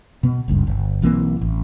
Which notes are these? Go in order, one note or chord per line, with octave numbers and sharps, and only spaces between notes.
B2 B3
F#1 C#2 G2
G1
B1 E3 A#3 C4
A1